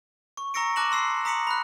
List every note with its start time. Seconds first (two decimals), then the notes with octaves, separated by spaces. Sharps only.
0.37 C#6
0.54 A#5 C#6 E6 A#6 C#7 D7
0.76 A5 D6 F#6 A#6 E7 F#7
0.92 C6 E6 C7
1.25 A#5 D#6 B6 C#7 F#7
1.47 B5 F#6